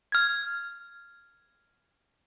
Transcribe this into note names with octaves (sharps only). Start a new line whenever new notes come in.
F6 G#6